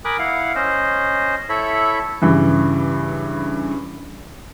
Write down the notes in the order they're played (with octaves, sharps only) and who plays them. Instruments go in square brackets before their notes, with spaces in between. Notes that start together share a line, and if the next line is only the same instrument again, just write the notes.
[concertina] A#4 G#5 B5 D6 D#6 F#6
E4 F5 F#5
C#4 C5 D#5
E4 A4 C#5 E5 B5
[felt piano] G2 C#3 E3